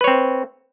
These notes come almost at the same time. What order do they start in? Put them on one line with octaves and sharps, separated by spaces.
B4 C#5 C4